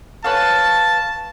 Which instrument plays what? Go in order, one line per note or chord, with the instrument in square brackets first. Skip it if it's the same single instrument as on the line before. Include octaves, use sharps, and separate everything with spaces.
[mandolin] B4 C#5 F5 [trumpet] A5